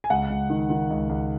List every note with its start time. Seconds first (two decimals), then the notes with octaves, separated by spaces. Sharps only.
0.04 G#5
0.10 C#2 F#5
0.30 C#2
0.50 D#3
0.70 D#3
0.90 C#2
1.09 C#2